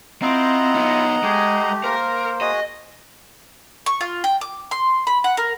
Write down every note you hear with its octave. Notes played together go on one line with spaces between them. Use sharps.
C4 E4 F4 D#5 F#5 A#5
B3 D#4
G#3 A3 G4
A#3 A#4 C5
F#4 G#4 D#5
C#6
F4
G5
D6
C6
B5
F#5
A#4